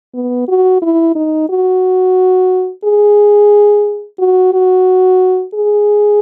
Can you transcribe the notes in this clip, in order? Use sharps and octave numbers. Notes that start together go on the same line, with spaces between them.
B3
F#4
E4
D#4
F#4
G#4
F#4
F#4
G#4